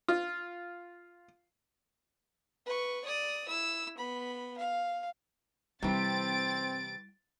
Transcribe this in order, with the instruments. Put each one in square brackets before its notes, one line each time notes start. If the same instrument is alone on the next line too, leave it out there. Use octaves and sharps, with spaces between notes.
[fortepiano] F4
[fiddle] B4 C#6
D5 D#6
E4 E6
B3 B5
F5
[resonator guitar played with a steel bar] C3 E3 [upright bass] G3 E4 [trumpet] C4 [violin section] A6 D7